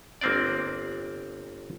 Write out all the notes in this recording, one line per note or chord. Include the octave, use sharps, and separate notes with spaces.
G1 A#3 C4 D4 D5